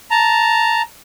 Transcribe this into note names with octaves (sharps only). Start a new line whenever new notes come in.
A5 A#5